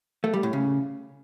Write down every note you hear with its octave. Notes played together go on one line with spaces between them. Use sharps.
A3
G3
A2
C#3